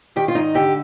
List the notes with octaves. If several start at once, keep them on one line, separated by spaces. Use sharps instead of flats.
D#3 G4
F4
G#2 D#4
D3 G4